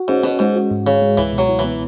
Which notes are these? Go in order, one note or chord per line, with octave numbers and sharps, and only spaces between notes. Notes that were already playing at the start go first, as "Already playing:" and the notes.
Already playing: F#4
G#2 C#4
B2 C#4
G#2 G#3
F#4
G#2
G#2 C#3
G#3
C#2 E3
B2
F#3
E4
E3 B3